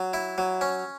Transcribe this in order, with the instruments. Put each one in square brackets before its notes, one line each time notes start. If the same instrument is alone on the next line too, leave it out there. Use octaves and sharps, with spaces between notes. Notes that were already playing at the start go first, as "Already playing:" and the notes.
Already playing: [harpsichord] F#3
E4
F#3
C#4